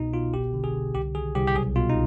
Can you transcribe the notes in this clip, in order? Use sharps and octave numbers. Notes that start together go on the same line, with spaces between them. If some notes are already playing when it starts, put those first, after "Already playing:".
Already playing: C2 B2 D#4
B2 F4
G1 G4
D3
G#4
D3
C2 G4
D#3 G#4
C2 G4
G4
B1 G#4
B2 F4
D#4